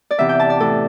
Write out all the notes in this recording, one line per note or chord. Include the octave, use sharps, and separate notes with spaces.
D5
E2 C3 E3 E5
G5
A5
D5
A2 E3 A4